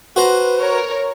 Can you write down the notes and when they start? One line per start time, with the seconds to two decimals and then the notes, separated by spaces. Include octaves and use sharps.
0.16 F#4 B4 C5 A#5
0.60 A#4 C#5